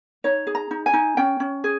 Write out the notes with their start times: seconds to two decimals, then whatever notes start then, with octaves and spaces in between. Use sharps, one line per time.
0.24 D#4 C#5
0.47 G#4
0.55 A#5
0.71 D#4
0.86 G#5
0.93 D#4
1.17 C#4 G5
1.40 C#4
1.64 G#4